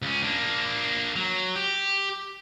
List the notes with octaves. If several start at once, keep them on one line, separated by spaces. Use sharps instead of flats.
C#2 C#4
A#3 D4
F#3
G4